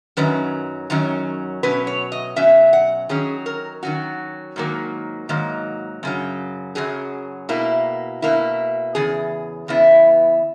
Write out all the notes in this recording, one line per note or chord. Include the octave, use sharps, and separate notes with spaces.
F#2 D#3 F#3 C#4 B4
F#2 D#3 F#3 C#4
B2 F#3 C#4 B4
C#5
D#5
B2 F#3 C#4 E5
F#5
D#3 F#3 C#4 G#4
A#4
D#3 F#3 C#4 F#4
G#2 D#3 F#3 A#3
G#2 D#3 F#3 A#3
F#2 C#3 F#3
F#2 C#3 F#3 G#4
B2 A#3 E4
B2 A#3 E4
E2 C#3 G#4
E2 C#3 B3 E4